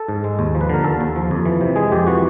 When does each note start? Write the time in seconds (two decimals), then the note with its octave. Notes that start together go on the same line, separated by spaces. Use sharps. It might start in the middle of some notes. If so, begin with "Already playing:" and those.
Already playing: A4
0.08 G#2
0.24 G#3
0.39 D#2
0.55 F3
0.61 B4
0.70 D3 A#4
0.84 D#2 A4
1.01 D#2
1.16 F3
1.31 F2
1.45 E3
1.61 C3
1.76 G#3 G#4
1.92 F2 G4
2.07 E3 F#4